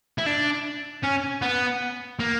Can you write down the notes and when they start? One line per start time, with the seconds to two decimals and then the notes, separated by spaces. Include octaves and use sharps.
0.18 E4
0.26 D4
1.03 C#4
1.42 B3
2.19 A#3